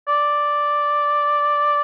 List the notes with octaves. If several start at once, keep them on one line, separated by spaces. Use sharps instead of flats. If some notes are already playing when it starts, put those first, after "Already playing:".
D5